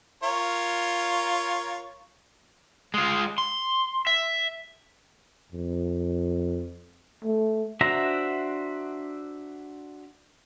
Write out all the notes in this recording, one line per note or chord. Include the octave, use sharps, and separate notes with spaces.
F4 A#4 C#5
G#3 F4
C6
E5
F2
A3
D4 F#4 C5 E5 A#5